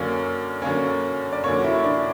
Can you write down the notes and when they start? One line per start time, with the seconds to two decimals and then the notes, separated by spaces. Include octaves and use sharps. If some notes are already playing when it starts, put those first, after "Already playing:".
Already playing: F#2 D3 A#3 C#4 D5
0.62 F#2 D3 A#3 C#4
1.32 D5
1.44 F#2 D3 A#3 C#4 C#5
1.59 F#4
1.64 E4
1.84 D4